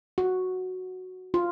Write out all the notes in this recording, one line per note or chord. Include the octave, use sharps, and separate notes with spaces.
F#4
F4